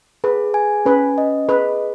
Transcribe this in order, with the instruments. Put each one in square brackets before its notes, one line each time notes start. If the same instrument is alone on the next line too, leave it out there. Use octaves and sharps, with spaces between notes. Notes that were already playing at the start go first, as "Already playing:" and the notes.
[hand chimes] G#4 [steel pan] B4
[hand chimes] G#5
[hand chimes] C#4 [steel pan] B4
[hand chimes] D#5
[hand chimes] G#4 [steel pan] B4